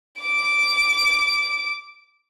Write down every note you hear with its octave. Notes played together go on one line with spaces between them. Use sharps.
D6 D7